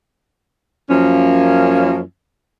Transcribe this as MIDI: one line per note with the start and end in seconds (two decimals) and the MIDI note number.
0.89 2.00 42
0.89 2.00 53
0.89 2.00 58
0.89 2.00 61